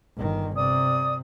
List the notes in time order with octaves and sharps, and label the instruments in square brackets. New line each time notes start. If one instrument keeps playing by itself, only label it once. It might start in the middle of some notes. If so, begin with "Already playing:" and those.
[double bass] G1 D#3
[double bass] C3 [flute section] D5 D#6